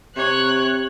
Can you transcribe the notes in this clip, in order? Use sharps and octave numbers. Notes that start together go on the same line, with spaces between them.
C3 C#5 F#6